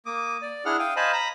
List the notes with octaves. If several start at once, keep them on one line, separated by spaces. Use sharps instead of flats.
A#3 D6 D#6
D5
D4 E4 G#4 F#5 F6
F5 G5 D#6
C5 D#5 F5 G#5 A5 B5
A#5 B5